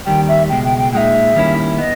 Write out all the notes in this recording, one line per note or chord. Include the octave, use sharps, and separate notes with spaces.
D#2 D#3 G3 G5
E5
C#2 B2 G#3 G5
G5
G5
A#2 G#3 D#4 E5 G5
D#3 G3 A#3 C#4 E4
B3 D#5